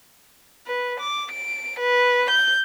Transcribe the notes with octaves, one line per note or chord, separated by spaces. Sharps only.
B4
D6
D7
B4
G6